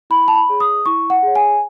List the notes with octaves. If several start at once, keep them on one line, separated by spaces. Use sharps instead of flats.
E4 B5
A5
B5
G#4 C#5
D#6
E4 C#6
F#5
G#4 C#5
G#5